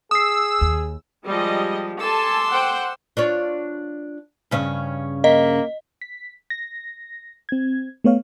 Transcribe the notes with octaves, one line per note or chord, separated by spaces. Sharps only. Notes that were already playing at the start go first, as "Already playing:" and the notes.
G#4 D#6 E6 C7
D#2
F3 G3 G#3 G4 D#5
A4 G#5 A5 C6 D6 E6
C5 F#5 G5
D4 F4 C#5
G2 C#3 C#4
A#3 D#5
B6
A#6
C4 G#6
A3 B3 C#5 F5